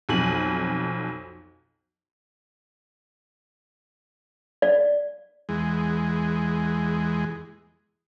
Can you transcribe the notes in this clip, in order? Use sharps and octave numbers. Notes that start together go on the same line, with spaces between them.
B1 F2 G#5 F#7
D5
E2 G#3